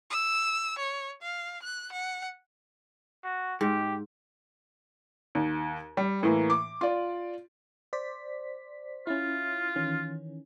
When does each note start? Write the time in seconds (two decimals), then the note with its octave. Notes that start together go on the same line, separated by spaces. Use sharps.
0.11 E6
0.79 C#5
1.22 F5
1.63 F#6
1.93 F#5
3.24 F#4
3.61 G#2 G4
5.35 D#2
5.97 G3
6.23 A2 E3 A#3
6.50 D6
6.81 F4 D5
7.93 C5 D5 B6
9.07 C#4 E4 F4
9.76 D#3 E3 C#4